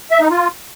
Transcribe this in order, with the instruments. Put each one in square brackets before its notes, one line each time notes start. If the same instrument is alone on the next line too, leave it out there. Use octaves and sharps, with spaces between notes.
[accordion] E5
D#4
F4